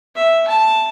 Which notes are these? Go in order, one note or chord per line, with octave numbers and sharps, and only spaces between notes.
E5
A5